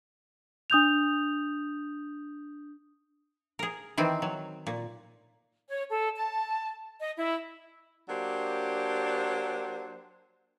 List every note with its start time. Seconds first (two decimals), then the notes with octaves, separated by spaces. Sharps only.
0.70 D4 D#6 G6 F7
3.59 G#4 A#4
3.98 D#3 E3 C4
4.22 F#3
4.67 A#2
5.69 C#5
5.89 A4
6.16 A5
7.00 D#5
7.16 E4
8.09 F#3 A#3 D4 G4 C5